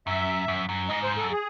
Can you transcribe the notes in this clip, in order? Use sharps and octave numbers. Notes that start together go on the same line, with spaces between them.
F#2 E5
F#2
F#2
G#2 D#5
C5
A4
F#2
G#4